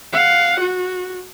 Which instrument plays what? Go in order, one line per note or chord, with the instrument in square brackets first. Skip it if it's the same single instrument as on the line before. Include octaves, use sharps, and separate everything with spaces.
[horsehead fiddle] F5 F#5
F#4